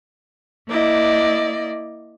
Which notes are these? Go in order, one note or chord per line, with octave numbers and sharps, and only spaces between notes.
A#3 E4 D5 D#5